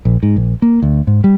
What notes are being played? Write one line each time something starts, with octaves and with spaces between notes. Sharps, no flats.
A#1
G#2
A#1
A#3
D2
G#2
G3